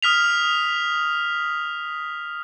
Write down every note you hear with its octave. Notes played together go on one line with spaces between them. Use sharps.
D#6 F6 B6 F7